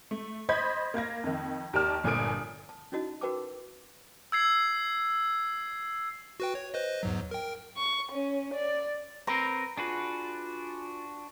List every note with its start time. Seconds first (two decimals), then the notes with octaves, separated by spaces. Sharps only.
0.11 A3
0.49 C5 D#5 B5 G6 G#6 B6
0.94 A#3 F5 G#6 A#6
1.24 F2 D#3
1.73 D#2 G4 A#4 D5 A5 F6
2.04 G1 A#2 A4 G#5 D#6 D7
2.69 A5
2.92 C#4 D#4 E4 F#4 D#5 A5
3.21 F#4 A#4 B4 G5 A5 D6
4.32 E6 G#6 C7
6.40 F#4 B4 G5
6.55 C#5
6.74 B4 C5 D#5
7.03 E2 G#2 F#3
7.31 A#4 G5
7.77 C#6
8.13 C#4
8.54 D5
9.27 C4 A#4 B4 A#5
9.78 D4 F4 F#4 G#4 B4